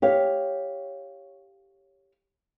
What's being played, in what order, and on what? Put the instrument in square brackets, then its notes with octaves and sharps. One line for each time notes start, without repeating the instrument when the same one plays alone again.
[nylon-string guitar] G4 C#5 F5